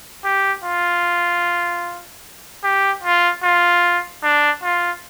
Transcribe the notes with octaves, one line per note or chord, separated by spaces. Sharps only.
G4
F4
G4
F4
F4
D4
F4